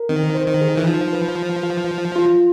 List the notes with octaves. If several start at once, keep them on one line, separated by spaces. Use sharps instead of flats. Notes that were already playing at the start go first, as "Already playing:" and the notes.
Already playing: A#4
D#3 C4
C5
D#3
G#4
E3
F3 D#4
B4
B4
F4
F4
F4